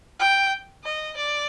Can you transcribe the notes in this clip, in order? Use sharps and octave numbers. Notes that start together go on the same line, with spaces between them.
G5
D#5
D5